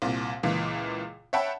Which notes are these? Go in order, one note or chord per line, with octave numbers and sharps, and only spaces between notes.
C2 A#2
C#2 A#2 E3
C#5 E5 F#5 G5 A5 B5